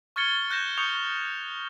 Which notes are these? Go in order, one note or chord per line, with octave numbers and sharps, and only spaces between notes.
C#6 F6 G#6 A6 C#7 G7
F#6 G6 A#6 E7
C#6 D#6 G6 C#7 F7